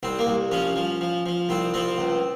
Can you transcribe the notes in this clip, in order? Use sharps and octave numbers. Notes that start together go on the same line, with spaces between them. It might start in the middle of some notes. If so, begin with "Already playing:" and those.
C2 C4
A#3
C2
F3 C#4
F3
F3
F3
C2 C4
F3 C4
C#2